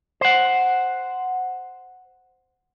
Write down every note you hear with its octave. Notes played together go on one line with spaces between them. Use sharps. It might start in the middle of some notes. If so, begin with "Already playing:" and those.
C5 F#5